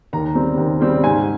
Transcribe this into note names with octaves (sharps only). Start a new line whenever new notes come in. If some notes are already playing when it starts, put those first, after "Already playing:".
D#2 A#5
C#3 G3 C4
D#2
C#3 G3 C4
G#2 G#5